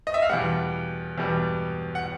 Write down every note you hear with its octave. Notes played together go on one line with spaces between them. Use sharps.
D#5
E5
F5
E2 B2 G3 F#5
E2 B2 G3
F#5